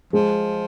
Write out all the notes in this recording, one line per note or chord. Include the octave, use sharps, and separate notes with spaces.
F3 G#3